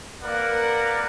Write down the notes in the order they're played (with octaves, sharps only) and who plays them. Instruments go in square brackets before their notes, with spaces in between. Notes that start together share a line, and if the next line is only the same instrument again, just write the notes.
[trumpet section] A#3 A#4 B4 D5 F#5